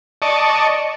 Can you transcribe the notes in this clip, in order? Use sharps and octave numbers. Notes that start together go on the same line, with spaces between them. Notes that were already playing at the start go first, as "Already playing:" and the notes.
D5 D#5 A5 C#6